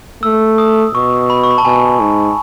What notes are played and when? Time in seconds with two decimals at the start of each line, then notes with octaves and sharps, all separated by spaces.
0.23 A3 E6
0.58 D#6
0.94 B2 C#6
1.30 B5
1.43 C#6
1.51 B5
1.58 A5
1.65 B2 G#5
2.00 G#2